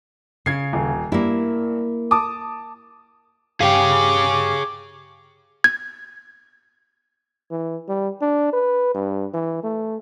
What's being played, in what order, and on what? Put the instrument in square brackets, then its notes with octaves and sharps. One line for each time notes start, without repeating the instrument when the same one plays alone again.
[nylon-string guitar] C#3 [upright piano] G#6 C7
[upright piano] D#1
[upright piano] G2 [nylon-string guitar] A#3 E4
[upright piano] A5 D6 D#6
[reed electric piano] G2 G5 [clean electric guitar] G4 F5 [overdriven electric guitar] G#4 C#5 [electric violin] D6
[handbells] G#6
[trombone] E3
G3
D4
B4
G2
E3
A3